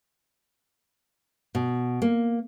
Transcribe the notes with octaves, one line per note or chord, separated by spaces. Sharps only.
B2
A#3